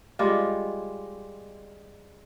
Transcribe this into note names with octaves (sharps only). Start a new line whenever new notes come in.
G3 G#3 F4 G4